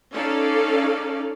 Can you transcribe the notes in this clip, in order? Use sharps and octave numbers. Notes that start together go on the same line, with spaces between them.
C#4 D#4 A4 D5 F5